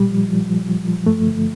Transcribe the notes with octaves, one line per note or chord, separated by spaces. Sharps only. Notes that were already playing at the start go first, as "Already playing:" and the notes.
Already playing: A#2 G3
F3
F3
F3
F3
F3
G2 A3
D3